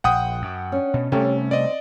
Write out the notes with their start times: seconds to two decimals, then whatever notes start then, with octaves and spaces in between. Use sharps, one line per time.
0.04 A#1 F#5 G5 D#6
0.42 F#2
0.72 C#4 D4
0.94 B2
1.12 C3 G3 A3 C#4 G4 A4 C#5
1.51 C4 D#4 D5 D#5